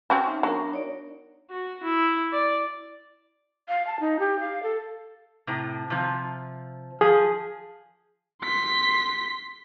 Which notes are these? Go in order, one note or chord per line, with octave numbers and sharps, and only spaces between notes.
C4 C#4 F#4
D#4 E5
F#3 B3 D4 A#4
D#4 C#5 D5
F#4
E4
D5
F5
A5
D#4
G4
F5
A4
A2 C3
C3 F3
F3 G#4
C6 B6